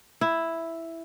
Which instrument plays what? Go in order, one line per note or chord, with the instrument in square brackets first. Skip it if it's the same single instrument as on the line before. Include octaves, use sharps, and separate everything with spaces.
[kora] E4